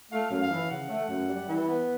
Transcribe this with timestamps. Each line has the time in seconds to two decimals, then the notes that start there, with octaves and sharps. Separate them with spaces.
0.11 A3 F5
0.31 F#2
0.41 F5
0.50 E3
0.71 C#3 F#5
0.89 A3
1.09 F#2
1.29 G3
1.48 E3
1.67 B3